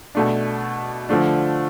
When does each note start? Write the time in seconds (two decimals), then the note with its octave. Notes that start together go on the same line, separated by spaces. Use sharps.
0.15 B2 A3 D4
1.09 D3 F3 A3 D4